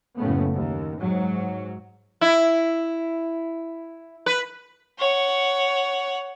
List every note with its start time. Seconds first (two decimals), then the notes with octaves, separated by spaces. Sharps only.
0.18 F#1 F#2 A2 C#3 A3 B3
0.53 D#2
1.00 G#2 F#3
2.21 E4
4.26 B4
4.99 C#5 F#5